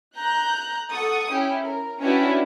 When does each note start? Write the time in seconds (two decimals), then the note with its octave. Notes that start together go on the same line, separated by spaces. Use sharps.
0.15 A#5 F#6 G6
0.89 A4 F#5 C#6 D#6
1.30 C#4 E4 G4
1.64 A#4
2.02 C#4 D4 E4 F#4 G4 B4